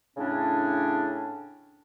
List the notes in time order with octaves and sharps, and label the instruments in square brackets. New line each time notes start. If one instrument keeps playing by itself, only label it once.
[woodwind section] A2 C#3 C#4 D4